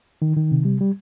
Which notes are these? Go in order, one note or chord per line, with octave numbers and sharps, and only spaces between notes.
D#3
D#3
C3
G3
G3